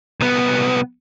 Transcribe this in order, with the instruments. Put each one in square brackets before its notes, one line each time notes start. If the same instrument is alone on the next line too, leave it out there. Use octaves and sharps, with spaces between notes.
[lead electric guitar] C2 B3